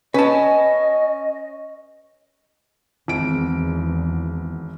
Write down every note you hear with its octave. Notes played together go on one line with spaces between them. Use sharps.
C#4 B4 D#5 A5
G#1 E2 D7